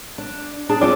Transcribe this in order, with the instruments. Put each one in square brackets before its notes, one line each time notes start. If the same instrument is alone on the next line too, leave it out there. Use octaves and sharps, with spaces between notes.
[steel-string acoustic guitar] D4
D4 G#4 A5
[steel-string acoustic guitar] C4 F4 [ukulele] D5